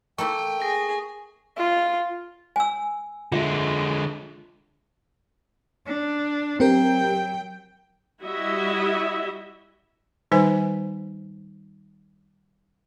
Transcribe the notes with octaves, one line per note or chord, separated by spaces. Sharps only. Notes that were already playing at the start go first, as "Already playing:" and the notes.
A3 A#3 E4 G5 C#6
G#4 A#6
F4
G#5 E6
D3 G#3 F4 E5
D4
F#3 C4 G4 A#4 G5
G3 E4 F#4 D#5 E5
D#3 G3 D#4 B4 C5 G#5